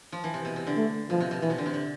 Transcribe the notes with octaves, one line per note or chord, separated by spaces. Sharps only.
F3
E3
C3
B2
C3
D3
A3
B2 F3
C3
B2
B2 E3
C3
D3
C3
D3